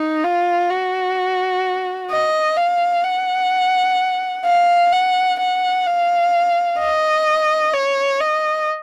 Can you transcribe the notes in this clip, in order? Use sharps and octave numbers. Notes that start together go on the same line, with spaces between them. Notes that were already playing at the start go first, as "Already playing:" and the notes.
Already playing: D#4
F4
F#4
D#5
F5
F#5
F5
F#5
F#5
F5
D#5
C#5
D#5